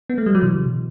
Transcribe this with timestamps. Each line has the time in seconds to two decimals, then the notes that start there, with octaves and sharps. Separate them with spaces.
0.10 B3
0.18 A3
0.26 G3
0.35 F#3
0.42 B2 E3
0.55 C#3
0.66 B2